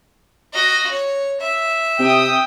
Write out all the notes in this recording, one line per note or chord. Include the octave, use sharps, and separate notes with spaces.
F#4 D#5
C#5
E5
C3 G5 D#6